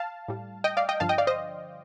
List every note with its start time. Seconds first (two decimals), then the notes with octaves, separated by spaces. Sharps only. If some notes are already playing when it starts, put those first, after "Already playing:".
Already playing: F5 A5
0.28 A2 G3
0.64 D#5 G5
0.77 D5 F5
0.89 D#5 G5
1.00 G2 D3 F3 F5 A5
1.09 D#5 G5
1.18 D5 F5
1.27 C5 D#5